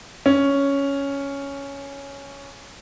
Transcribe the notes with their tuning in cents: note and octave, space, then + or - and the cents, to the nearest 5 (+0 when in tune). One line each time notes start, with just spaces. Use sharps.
C#4 +5